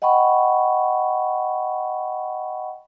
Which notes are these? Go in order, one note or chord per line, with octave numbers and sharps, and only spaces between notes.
D#5 F#5 G5 B5 C#6